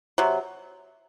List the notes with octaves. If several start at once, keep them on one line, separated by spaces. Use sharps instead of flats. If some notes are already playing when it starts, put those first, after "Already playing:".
C3 F#3